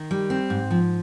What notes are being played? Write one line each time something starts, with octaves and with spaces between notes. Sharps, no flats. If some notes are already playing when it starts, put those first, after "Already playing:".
Already playing: D#3
G3
C4
G#2
F3